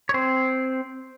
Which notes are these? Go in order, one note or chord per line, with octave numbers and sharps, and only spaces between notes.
C#5
C4 C5